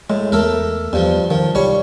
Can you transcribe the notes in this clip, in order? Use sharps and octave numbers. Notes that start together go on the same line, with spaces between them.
A2 G#3
E2 A3 A4 A#4
E2 G2 F3
D#3 F3
C2 G3 C#5 C#6